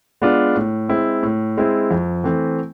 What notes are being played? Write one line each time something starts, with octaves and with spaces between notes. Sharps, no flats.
G#3 B3 D4 F4
A2
G#3 C4 E4
A2
G#3 C4 E4
F2
E3 A3 C4